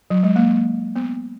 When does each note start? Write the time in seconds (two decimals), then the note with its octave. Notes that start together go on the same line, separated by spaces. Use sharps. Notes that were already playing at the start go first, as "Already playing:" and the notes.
0.10 F#3
0.23 G#3
0.36 A#3
0.96 B3